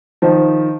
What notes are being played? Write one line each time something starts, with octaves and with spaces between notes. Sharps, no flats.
D#3 F3